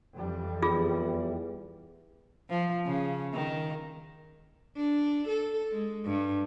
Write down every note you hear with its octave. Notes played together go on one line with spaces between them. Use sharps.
F2 E3 G3
E2 F4 G#4
F3
C#3
D#3
D4
A4
G#3
G2